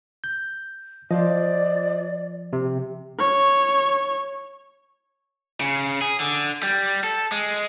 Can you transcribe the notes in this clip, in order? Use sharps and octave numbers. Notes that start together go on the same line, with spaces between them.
G6
F3 F4 C5 D5 D#5
C3
C#5
C#3
G#4
D3
G3
A4
G#3